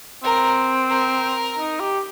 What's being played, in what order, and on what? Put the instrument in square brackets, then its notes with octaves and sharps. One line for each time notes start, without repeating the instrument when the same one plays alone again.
[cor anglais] C4 [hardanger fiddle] A#4
[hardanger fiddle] A#4
[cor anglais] D#4
G4